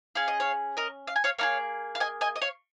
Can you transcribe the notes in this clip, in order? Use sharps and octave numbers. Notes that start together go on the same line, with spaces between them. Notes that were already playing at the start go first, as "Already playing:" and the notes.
C#4 G#4 F5
D#5
C#5 F5
A#4 D#5
F5
G#5
C#5 F5
A#3 D#4 G#4 C#5 F5
F5
D#5 G#5
D#5 G#5
D#5
C#5 F5